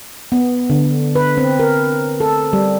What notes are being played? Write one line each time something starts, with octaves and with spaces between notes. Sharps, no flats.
B3
D3
B4
C4
A#4
A4
G3